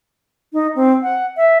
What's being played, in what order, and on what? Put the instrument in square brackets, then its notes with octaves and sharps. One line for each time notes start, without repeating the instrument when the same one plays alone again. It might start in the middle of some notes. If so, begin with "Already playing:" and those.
[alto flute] D#4
C4
F#5
E5